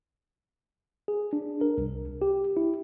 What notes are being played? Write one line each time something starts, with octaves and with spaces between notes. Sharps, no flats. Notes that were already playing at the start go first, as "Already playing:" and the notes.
G#4
D4
A#4
C2
G4
E4